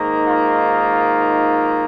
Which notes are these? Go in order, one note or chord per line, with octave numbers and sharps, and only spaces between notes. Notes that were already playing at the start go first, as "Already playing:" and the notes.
Already playing: G#2 D#3 A#3
F4